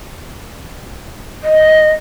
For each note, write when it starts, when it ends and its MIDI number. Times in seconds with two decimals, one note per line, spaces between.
1.44 1.93 75